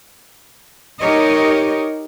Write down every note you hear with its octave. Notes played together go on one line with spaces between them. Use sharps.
D#4 G4 A#4 C#5 D#5